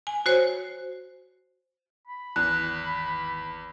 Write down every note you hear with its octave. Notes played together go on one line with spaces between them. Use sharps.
G#5
F#4 C5 C#5
B5
G#1 E2 F#6